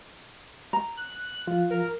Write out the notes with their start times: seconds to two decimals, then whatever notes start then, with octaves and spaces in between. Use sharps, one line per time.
0.73 A#5
0.97 F#6
1.47 F3 F4
1.71 A#4